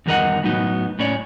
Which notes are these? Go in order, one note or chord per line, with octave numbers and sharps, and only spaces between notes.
E2 G2 D#3 A#4 D#5 F#5
A2 F#3 B3 D#4
A2 C#4 C#5 D5